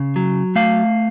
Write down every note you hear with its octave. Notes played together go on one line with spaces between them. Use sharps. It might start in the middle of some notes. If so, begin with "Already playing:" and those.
Already playing: C#3
F#3
A3 F5